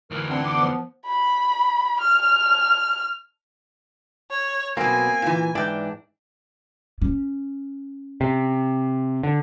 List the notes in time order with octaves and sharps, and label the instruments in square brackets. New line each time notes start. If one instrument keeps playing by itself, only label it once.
[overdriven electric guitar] D2 E3 [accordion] A#4
[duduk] C4 [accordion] D4 F#5 C6
[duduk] B3 [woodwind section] D6
[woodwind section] F3
[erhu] B5
F6
C#5
[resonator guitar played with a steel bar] B2 F#3 [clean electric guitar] A#3 C4 [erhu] G#5
[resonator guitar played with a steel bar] A#2 E3
[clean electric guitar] G#2 E3 D4 [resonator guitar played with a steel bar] D5 G5
[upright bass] C#4
[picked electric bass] C3
D3